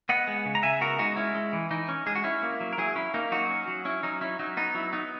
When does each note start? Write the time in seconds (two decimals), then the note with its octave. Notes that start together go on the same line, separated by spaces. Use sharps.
0.09 B3 D#5 F#5
0.28 G#3
0.45 C#3
0.55 A#5
0.63 C#3 E5 G#5
0.81 B3 F#4 A#4
0.99 G#3 D#4 F#4
1.16 C#4 E4
1.35 G#3
1.53 E3
1.71 E3 D#4
1.89 C#4
2.06 G#3 G#4
2.15 F#4
2.24 C#4 E4
2.43 A#3
2.60 F#3
2.73 A#4
2.78 F#3 E4 G#4
2.95 C#4 E4
3.14 A#3 D#4
3.32 F#3 D#4 F#4
3.50 C#4
3.68 F#3
3.85 C#4 E4
4.03 F#3 D#4
4.21 C#4 E4
4.39 F#3 D#4
4.57 B3 D#4
4.75 F#3 E4
4.93 B3 D#4